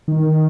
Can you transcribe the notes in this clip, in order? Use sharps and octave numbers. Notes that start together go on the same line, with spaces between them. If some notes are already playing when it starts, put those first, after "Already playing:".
D#3